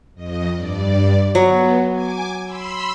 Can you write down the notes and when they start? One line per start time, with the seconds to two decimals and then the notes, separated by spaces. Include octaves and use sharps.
0.15 F2 D#5
0.53 G2 D5
1.35 F#3 B3
1.90 G#5 D6
2.44 B5 C6 E6